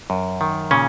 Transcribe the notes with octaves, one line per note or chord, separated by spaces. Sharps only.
F#2
D#3
A#2 C#3 C#4